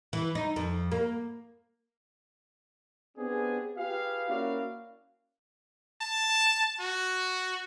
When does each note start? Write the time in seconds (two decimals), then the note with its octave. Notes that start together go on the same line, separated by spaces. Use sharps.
0.13 E3
0.35 D#4
0.56 F2
0.92 A#3
3.17 B3 C4 D4 G4 G#4
3.77 F4 G4 G#4 B4 F5
4.28 A#3 C#4 E4 F#4 D5 F5
6.01 A5
6.81 F#4